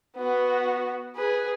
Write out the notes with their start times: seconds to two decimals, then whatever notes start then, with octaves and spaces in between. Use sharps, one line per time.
0.17 B3 F#4
1.16 G#4 B4